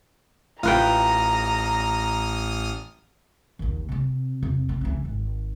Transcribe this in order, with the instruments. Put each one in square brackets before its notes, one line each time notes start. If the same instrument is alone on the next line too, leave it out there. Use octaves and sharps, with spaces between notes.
[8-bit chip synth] A1 D#6 F6 [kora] F4 B4 G5 [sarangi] A#5
[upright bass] A#1 D#2
C3 C4
E2 C3
C4
C#2 E3
G#1